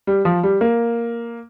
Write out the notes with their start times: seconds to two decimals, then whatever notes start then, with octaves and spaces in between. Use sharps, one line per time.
0.07 G3
0.25 F3
0.43 G3
0.61 A#3